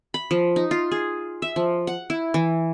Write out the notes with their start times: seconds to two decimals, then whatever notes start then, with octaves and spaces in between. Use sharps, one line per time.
0.14 B5
0.31 F3
0.56 D#4
0.71 F4
0.91 G#4
1.42 E5
1.56 F3
1.87 F#5
2.10 E4
2.34 E3